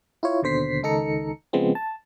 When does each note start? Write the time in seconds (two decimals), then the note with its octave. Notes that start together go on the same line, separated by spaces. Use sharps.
0.23 E4 F4 C#5
0.42 D#2 B2 D3 C5 B6 C7
0.83 C#2 D#3 D#4 A4 A#5 C#7
1.53 C#3 F3 G#3 B3 C4
1.75 A5